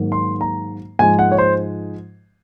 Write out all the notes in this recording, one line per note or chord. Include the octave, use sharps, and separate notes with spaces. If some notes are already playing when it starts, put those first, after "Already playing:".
Already playing: G#2 D#3 F#3 A#3
C6
A#5
G#2 F3 G#3 G#5
F#5
C#5
C5